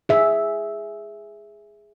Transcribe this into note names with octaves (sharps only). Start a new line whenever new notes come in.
G#4 E5